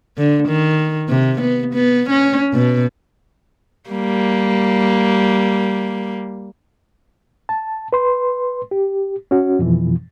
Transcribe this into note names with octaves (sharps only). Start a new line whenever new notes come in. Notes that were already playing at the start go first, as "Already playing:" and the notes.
D3
D#3
C3
B3
B3
C#4
B2
G3 A#3
A5
B4 C6
G4
C#4 F#4
F2 B2 E3 F3